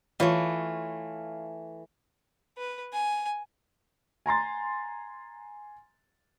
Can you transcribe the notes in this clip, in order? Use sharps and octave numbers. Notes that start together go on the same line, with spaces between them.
E3 A3 F4 C#5
B4
G#5
G#5 A#5 C6 A6